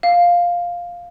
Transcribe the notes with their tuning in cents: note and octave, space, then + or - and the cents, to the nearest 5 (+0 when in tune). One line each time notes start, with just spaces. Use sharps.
F5 +5